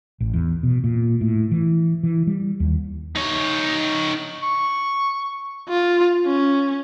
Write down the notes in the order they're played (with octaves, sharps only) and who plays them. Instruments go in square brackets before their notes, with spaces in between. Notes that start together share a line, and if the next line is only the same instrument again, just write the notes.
[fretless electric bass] A1
E2
B2
A#2
A2
E3
E3
G3
D#2
[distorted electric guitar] D#4 C#5
[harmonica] C#6
[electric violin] F4
C#4